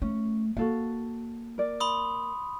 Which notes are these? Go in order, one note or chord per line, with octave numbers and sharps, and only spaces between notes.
A3 C#4
A#3 F#4 A4 F5
A#4 D5
B5 C6 D#6